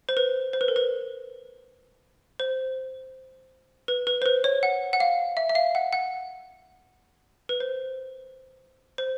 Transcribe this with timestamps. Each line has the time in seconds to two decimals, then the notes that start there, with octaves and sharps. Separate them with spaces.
0.09 C5
0.17 B4
0.53 C5
0.61 B4
0.68 A#4
0.76 B4
2.40 C5
3.88 B4
4.07 B4
4.22 C5
4.26 B4
4.44 C#5
4.63 F#5
4.93 F#5
5.00 F5
5.37 E5
5.49 E5
5.55 F5
5.75 F#5
5.93 F#5
7.49 B4
7.60 C5
8.98 C5